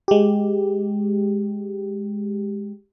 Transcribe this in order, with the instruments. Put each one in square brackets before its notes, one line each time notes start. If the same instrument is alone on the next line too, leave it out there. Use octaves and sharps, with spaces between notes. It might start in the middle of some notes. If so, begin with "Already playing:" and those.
[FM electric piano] G#3 G4